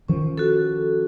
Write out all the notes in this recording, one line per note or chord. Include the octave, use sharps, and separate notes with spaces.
D#3 F3 C#4
F#4 A4